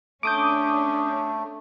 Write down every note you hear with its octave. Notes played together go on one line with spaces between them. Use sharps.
A3 C#4 D4 D6 D#6 G6